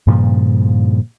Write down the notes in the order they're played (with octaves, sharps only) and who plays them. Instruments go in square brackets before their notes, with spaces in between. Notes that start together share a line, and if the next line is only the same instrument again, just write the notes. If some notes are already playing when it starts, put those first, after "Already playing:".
[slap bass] G2 A#2 C#3 F3